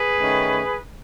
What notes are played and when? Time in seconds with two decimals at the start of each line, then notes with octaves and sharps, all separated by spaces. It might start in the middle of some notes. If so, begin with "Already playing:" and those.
Already playing: G#4 B4
0.18 D#3 A3 C#4